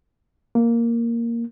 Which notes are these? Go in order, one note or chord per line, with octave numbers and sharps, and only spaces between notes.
A#3